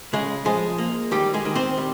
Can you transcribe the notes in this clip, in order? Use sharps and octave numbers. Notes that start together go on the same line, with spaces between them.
C#3 G#3 G#4
F3 G#3 G#4
A#3
D#3 G3 G4
G#3 G#4
D#3
C4 C5
G3